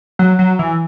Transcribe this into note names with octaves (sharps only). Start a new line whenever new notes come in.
F#3
F#3
E3